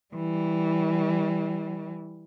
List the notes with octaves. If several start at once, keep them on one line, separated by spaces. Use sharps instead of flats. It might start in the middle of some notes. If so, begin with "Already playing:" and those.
E3 G3